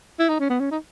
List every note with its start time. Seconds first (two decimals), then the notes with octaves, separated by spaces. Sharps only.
0.19 E4
0.29 D#4
0.40 C#4
0.50 B3
0.60 C#4
0.71 D#4